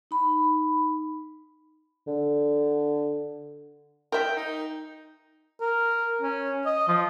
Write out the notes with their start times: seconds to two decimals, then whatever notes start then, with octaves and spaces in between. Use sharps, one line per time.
0.11 D#4 B5
2.07 D3
4.12 A#4 E5 G5
4.36 D#4
5.61 A#4
6.22 C#4
6.66 D#5
6.88 F3